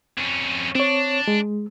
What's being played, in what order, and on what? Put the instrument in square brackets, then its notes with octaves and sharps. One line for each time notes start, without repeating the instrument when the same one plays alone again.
[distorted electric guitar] F2 C#4
[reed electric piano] C4 C#5 [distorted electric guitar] D4
[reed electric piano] G#3